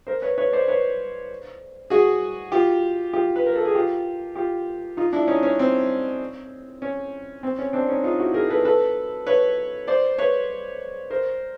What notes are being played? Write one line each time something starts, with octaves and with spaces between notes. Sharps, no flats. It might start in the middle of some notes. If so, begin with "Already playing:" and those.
A#4 C5
B4 C#5
B4 C#5
C5 D5
B4 C#5
F#4 G#4
F4 G4
F4 G4
B4
A#4
A4
G#4
F4 G4
F4 G4
D#4 F4
D4 E4
C#4 D#4
C#4
C4
C#4
C4
C#4
C4 D4
C#4 D#4
D#4 F4
E4 F#4
G#4 A#4
A4 B4
A4 B4
B4 C#5
C5 D5
B4 C#5
A#4 C5